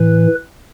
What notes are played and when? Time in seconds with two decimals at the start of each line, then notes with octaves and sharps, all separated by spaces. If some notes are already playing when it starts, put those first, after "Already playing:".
Already playing: A2 E3 B4